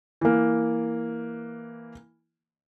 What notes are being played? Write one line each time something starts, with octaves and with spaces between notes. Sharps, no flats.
E3 A#3